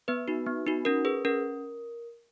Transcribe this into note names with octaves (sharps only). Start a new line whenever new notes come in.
B3 B4
D#4 F#4
B3
D#4 F#4
C#4 A#4
G#4 B4
C#4 A#4